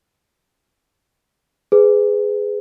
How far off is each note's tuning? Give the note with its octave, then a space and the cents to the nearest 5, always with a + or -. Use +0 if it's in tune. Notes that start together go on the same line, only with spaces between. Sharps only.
G#4 +0 B4 +30